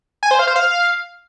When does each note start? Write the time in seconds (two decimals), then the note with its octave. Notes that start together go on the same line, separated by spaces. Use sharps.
0.23 G#5
0.31 C5
0.39 F5
0.47 C5
0.56 F5